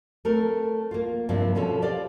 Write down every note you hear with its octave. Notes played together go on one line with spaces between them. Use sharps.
A3 C4 A#4
A#3 F4
G2 C3 F3 A#3 C4 D4
B2 F3 C#4 F4 A4
G4 C5 D5 F5